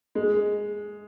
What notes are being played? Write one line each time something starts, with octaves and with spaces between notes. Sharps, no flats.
G#3